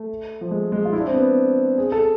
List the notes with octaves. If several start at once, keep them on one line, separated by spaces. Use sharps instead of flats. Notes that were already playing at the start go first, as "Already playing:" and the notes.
Already playing: A3
F3
G#3
G#3
F4
E4
D4
C4
B3
G#4
A4